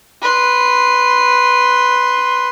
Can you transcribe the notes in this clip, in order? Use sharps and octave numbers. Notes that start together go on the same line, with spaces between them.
B4 C6